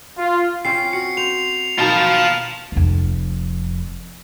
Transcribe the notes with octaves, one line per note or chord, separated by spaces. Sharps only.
F4
C4 C#4 F4 C7
F#4 C#7
C5 F7
B2 D#3 A#3 F4 A5 F6
E7
F1 F2